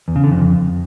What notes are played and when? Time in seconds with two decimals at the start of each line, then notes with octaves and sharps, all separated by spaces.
0.08 E2
0.16 C#3
0.24 D3
0.32 F2